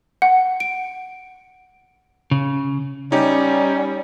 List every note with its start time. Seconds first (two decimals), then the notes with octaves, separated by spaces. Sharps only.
0.22 F#5
0.60 D7
2.31 C#3
3.12 G3 C#4 D#4 G4